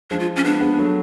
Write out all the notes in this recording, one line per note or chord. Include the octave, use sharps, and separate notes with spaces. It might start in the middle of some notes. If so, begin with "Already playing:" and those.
F3 G#3 D4
F4
C#4
G#3 B3 D4
G#3 B3
F#3 A3